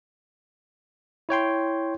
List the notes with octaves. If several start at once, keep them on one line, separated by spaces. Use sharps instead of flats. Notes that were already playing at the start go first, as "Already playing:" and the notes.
E4 C#5 G5 C6